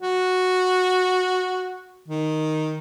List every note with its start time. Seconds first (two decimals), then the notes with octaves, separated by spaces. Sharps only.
0.01 F#4
2.08 D#3